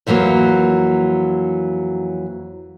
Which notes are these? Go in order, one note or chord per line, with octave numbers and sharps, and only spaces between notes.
F2 E3 F#3 A3 A#3